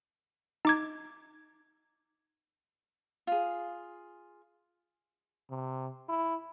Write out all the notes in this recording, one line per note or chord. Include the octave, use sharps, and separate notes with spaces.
D#4 D6 G#6
F4 G#4
C3
E4